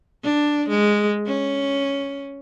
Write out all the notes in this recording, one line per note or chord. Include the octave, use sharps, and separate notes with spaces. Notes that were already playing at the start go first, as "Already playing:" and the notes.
D4
G#3
C#4